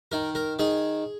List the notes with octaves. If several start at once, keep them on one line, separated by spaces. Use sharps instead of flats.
D#3 A#4
A#4
D#3 G#4